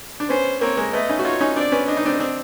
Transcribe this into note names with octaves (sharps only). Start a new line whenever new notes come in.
D4
B3 C#4 C5
A#3 C4 C#5
G#3 A#3
A3 B3 D#5
C#4 D#4
F#4
D#4 F4 C#5
C#4 D#4
C4 D4 D5
B3 C#4
D4 D#5
D#4
C4 D4
C4 D4